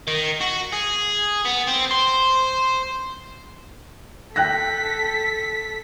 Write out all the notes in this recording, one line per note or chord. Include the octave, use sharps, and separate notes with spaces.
D#3
F#4
G#4
B3
C4
C5
A4 G5 F#6 A#6 B6